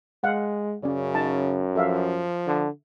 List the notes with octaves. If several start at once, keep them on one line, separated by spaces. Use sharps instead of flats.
G#3 F5 F#5
F#2 C#3 C#4 D5
D#4 A5
F3 A4 E5 F5
D3